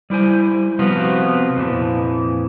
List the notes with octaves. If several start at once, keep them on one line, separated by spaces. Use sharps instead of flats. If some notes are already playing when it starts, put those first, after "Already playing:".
G3 E4 C5 G#5
C3 F3 B3 F4 F#4 B4
F2 A#2 E3 F3